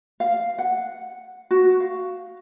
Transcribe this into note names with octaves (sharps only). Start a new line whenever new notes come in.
F5
F#5
F#4
F5